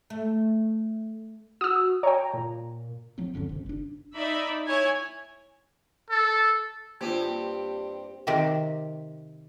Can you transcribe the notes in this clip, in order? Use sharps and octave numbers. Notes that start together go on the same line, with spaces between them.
A3
F#4 D#6 E6
C#5 G5 A#5
A#2
F3 F#3 A#3 C4
D1 F#2 D3 C#4
G#1 C3
F#1 D4
D#4 D5 E5 B5
E4 C#5 G#5
A4
G2 A#3 C4 F4 G4
C3 D#3 C4 G4